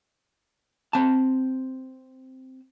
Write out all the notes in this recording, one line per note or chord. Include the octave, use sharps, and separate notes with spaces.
C4 A5